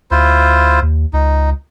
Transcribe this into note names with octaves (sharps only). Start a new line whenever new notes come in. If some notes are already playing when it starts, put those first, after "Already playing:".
D2 E4 F4 C5
D#2
C#2 D#4